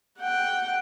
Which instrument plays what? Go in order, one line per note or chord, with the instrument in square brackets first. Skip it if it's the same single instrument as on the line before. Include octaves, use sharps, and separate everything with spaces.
[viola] F#5 G5